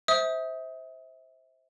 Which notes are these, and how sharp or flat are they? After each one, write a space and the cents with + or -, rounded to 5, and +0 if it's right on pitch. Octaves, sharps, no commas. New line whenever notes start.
C5 +0 E5 -25 D#6 +20